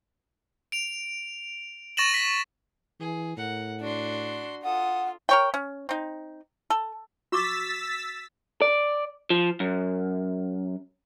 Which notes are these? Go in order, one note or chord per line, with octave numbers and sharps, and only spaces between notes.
D7 F7
C#6 A6 A#6 D#7 E7 F#7
B6
E3 G#4
A2 A#4 F#5
D4 F#4 C6
F4 A4 F#5 D#6
A#4 C#5 G5
C#4
C4 D#4
A4
F#4 C#6 D6 E6 A6 B6
D5
F3
F#2